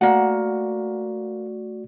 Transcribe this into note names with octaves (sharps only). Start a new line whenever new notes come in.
A3 A#3 F#4 D5 F#5